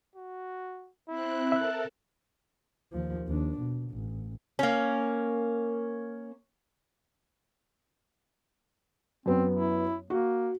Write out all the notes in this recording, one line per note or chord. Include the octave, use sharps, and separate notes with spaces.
F#4
C4 E4 F#6
A4 A#4 E5 A5 F#6
D#2 F3
D#2 D4
B2
A1
A#3 C#4
F#2 B3 C4
E4
A#3 F#4